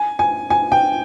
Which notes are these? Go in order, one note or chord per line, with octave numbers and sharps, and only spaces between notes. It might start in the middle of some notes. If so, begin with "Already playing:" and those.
Already playing: G#5
G#5
G#5
G5